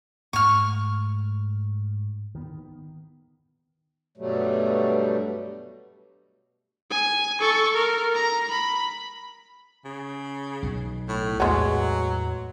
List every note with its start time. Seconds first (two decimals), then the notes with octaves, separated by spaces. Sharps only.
0.33 G#2 A3 C#6 F6
2.35 D#3 B3
4.17 G2 B2 F#3 G3 A3
6.90 G#5
7.40 A4 C#6
7.74 A#4
8.15 A#5
8.51 B5
9.85 C#3
10.63 B1 B2
11.08 A2
11.40 E2 A2 F#3 G#3 B3